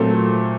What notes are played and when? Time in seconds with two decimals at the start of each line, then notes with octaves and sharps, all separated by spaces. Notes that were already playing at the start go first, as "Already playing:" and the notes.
Already playing: A#2 F#3 A3 C4 A4